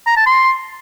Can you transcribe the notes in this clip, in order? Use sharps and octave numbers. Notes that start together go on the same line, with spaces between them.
A#5
A5
C6